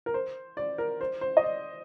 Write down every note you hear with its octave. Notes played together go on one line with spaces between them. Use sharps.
A#4
C5
D5
A#4
C5
C5
D#5
D5